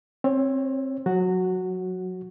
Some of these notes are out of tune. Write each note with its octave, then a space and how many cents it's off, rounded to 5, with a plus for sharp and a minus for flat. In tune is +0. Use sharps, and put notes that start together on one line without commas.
C4 +20 C#5 +0
F#3 -25 F#4 +0